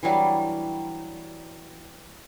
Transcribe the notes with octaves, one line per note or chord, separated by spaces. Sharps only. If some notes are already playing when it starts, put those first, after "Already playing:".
E3 F#3 G3 D4